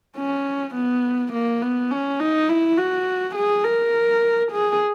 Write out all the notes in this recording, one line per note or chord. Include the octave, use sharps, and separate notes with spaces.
C#4
B3
A#3
B3
C#4
D#4
E4
F#4
G#4
A#4
G#4